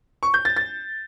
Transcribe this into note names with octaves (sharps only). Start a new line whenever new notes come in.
C#6
G6
A6
A6